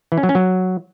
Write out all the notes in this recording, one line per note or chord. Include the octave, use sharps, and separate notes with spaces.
E3
C#4
F#3
C#4
F#3